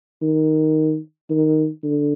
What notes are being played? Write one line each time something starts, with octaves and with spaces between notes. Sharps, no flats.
D#3
D#3
D3